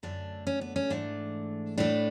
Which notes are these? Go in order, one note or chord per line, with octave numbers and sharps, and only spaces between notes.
F#2 D3 A3 D4
C#4
B3
C#4
G#2 E3 A3 D4
A2 E3 A3 D4